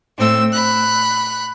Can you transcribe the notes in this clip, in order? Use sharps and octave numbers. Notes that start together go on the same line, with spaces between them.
A2 C4 E6
B5 F#6